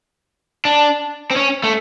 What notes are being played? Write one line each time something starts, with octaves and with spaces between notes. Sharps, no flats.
D4
C4
C#4
A3